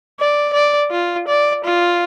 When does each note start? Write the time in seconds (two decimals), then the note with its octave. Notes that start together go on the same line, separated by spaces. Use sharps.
0.19 D5
0.53 D5
0.91 F4
1.28 D5
1.64 F4